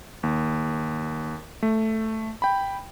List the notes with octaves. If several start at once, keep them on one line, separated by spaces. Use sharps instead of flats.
D#2
A3
G5 B5